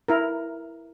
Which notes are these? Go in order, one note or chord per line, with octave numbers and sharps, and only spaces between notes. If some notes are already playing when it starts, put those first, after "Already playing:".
E4 A#4